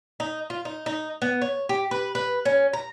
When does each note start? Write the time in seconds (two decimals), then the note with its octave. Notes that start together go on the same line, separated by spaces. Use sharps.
0.20 D#4
0.50 F4
0.65 D#4
0.86 D#4
1.22 B3
1.42 C#5
1.69 G4
1.91 B4
2.15 B4
2.45 C#4
2.73 A#5